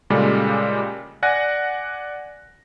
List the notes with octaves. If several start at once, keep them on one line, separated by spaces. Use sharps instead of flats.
A#2 C#3 G3 G#3 G4 A4
D5 F#5 G#5 F#6 A#6